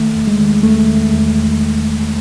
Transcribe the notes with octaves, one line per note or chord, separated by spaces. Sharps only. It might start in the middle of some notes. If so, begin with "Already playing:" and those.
Already playing: D#3 A3
E2
G#3
D#3
E2 A3
D#3
E2